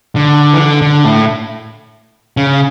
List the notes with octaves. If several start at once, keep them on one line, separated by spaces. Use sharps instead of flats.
D3
E3
D3
D3
A2
C#3